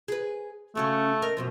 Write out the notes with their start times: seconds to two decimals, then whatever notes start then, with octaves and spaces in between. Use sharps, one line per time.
0.08 G#4 B4
0.75 C#3 A3 C#4 F#4
1.22 A#4 D#5
1.37 F#2 B2 F3